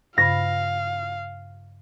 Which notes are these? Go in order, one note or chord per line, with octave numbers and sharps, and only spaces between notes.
G2 C#3 F5 B5 A#6